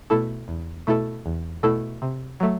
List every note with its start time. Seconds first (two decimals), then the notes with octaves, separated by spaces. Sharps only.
0.10 B2 A3 E4 A4
0.48 E2
0.87 B2 A3 E4 A4
1.26 E2
1.63 B2 A3 E4 A4
2.02 C3
2.40 F#3 A3